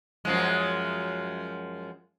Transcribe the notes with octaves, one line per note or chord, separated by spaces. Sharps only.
F#2 F3 G#3